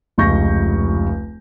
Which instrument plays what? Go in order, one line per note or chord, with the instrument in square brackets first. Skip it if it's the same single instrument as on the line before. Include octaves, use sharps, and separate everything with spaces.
[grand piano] F1 C#2 C#6 G6 A#6